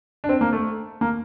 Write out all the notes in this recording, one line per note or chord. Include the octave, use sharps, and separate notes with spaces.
D4
C4
A#3
A3
A#3